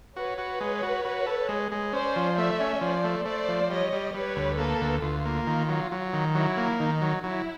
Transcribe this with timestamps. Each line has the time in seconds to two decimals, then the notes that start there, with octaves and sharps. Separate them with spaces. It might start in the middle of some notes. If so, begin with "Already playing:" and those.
0.16 F#4 B4 C#5
0.38 F#4
0.61 G#3
0.83 F#4
1.05 F#4
1.26 A4
1.49 G#3
1.72 G#3
1.93 C#4 C5 D5
2.16 F3
2.37 A3 D5 E5
2.60 C#4
2.81 F3 C5 D5
3.04 A3
3.25 A3 C5 D5
3.48 F3
3.70 G3 C#5 D#5
3.93 G3
4.14 G3 B4 C#5
4.36 D2
4.58 A#3 A4 B4
4.81 D2
5.03 D2 F4
5.25 A#3
5.47 D#3
5.69 F#3
5.92 F#3
6.13 D#3
6.35 F#3 E4
6.57 A#3
6.80 D#3 D#4
7.01 F#3
7.23 F#3 E4